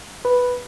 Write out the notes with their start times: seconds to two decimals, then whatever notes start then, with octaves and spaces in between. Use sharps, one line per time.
0.25 B4